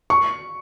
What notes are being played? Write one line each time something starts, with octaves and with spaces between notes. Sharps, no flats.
C#6